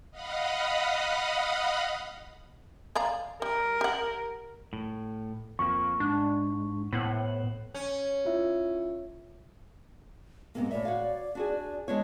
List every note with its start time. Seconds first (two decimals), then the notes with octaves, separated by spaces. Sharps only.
0.11 D#5 F5 F#5 B5 D#6
2.95 D5 F5 A#5
3.42 G3 A#4
3.81 G4 F#5
4.73 A2
5.59 F2 F3 A#3 C#6
6.00 G#2 D4
6.93 A2 B3 C5 F#5
7.74 C#4
8.25 E4 F4 E5
10.55 G#2 C3 A#3 B3
10.71 A2 C#5 D5 E5
10.85 F#4 C#5 F5
11.35 D4 F#4 G#4
11.88 G#3 B3 D4 C#5